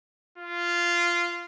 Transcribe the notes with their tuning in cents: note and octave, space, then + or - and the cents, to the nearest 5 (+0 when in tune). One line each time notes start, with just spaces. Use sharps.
F4 -10